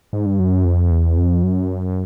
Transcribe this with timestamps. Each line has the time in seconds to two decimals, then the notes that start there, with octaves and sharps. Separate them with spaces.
0.13 G#2
0.26 G2
0.39 F#2
0.65 F2
0.91 E2
1.17 F2
1.43 F#2